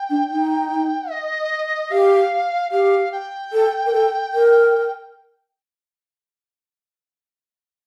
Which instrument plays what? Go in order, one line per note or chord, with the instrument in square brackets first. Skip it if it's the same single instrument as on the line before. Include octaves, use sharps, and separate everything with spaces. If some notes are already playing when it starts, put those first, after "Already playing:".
Already playing: [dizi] G5
[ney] D4
D#4
[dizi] D#5
[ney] G4 [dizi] F5
[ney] G4 [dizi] F5
[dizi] G5
[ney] A4
A#4
A4
A#4